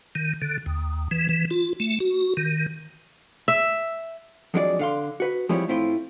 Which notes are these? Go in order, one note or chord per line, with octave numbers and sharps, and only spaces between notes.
D#3
D3
D#2
E3
E3
F4
A3
F#4
D#3
E5
F2 F#3 G#3 D4 E4 D5
D3 F5 C6
F#4 B4
F3 G3 G#3 C4 E4 C#5
A2 C4 E4 F4 C6